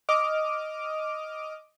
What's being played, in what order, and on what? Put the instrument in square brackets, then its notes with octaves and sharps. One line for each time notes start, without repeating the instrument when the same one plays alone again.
[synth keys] D#5 D6 D#6 F6